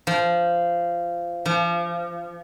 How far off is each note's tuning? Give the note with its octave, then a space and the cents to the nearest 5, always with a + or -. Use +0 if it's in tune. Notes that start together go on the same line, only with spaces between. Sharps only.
F3 -15
F3 -30